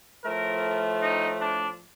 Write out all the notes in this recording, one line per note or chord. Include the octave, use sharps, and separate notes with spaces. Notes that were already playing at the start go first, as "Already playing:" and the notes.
A2 F3 A3 A#4
D#4
D4